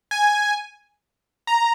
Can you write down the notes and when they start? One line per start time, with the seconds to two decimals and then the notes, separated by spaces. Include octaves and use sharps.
0.11 G#5
1.47 A#5